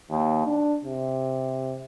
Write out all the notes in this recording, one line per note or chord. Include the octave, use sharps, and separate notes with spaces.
D#2
D4
C3